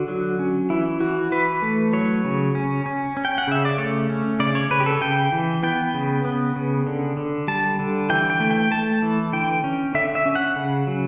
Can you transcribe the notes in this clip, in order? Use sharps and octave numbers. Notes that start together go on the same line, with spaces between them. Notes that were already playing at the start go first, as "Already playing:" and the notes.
Already playing: D3 F#4
F#3
C#4
E3 E4
E3 F#4
E3 B4
A3
F#3 C#5
C#3
C#4
C#4
C#4
G5
F#5
C#3 E5
D5
A3 C#5
C#4
C#3 D5
C#5
C#3 B4
G4
A4
C#3 G5
E3
B3 G5
C#3
B3
C#3
D3
D3
G3 A5
D3
E3 G5
G5
A3
G5
A3 A5
E3
D3 G5
C#4
D3 E5
E5
C#4
F#5
C#3
F#3